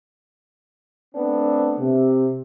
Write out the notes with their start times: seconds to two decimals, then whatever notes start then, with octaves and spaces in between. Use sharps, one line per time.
1.15 A3 B3 C4 D4
1.79 C3